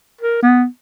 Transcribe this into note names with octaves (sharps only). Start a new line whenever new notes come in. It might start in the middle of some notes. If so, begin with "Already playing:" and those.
A#4
B3